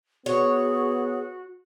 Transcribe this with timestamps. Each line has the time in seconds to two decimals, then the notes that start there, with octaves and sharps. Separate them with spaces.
0.26 B3 F#4 G#4 C#5